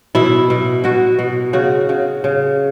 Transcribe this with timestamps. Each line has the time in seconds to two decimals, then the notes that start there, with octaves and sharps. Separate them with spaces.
0.15 B2 E4
0.50 B2
0.84 B2 F#4
1.19 B2
1.53 C#3 F#4
1.89 C#3
2.24 C#3